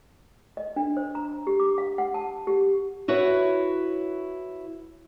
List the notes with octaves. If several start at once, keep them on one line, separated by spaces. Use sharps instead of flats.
D#5
D4
C5
A#5
G4
D6
F5
F#5
A5
G4
E4 F#4 B4 C#5